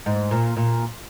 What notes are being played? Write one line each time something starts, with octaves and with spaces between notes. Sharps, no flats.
G#2
A#2
A#2